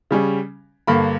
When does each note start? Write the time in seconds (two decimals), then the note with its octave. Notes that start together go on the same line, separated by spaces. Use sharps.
0.11 C#3 G3 C#4
0.87 G2 D3 A#3 B5